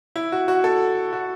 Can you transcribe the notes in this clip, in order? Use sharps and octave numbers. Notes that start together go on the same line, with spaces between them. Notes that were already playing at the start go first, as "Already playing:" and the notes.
E4
F#4
F#4
A4
F#4